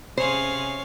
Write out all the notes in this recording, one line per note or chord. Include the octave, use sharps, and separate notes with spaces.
C3 C#4 G#4 C5 C#5 F5